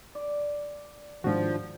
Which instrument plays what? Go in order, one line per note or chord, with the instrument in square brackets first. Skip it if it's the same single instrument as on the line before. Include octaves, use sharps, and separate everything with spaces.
[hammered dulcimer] D5
[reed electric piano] G#2 F#4 [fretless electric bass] D#3 D4 [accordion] F3